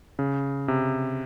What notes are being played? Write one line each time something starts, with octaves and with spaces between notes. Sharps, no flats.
C#3
C3